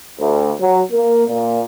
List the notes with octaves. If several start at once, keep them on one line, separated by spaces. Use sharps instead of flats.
D2
F#3
A#3
A#2